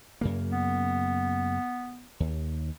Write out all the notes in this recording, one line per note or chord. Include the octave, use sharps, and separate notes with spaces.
F#2 C#3 A#3
B3
D#2